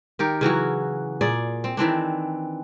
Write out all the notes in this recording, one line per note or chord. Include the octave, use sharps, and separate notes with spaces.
D#3 G4 A#4
C#3 E3 F#3 F#4
A#2 G#4 D5
C4
D#3 E3 C4 D4